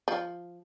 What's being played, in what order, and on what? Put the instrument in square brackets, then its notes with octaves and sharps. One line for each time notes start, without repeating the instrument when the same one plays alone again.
[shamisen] F3